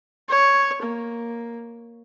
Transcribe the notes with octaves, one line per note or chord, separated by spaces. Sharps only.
C#5
A#3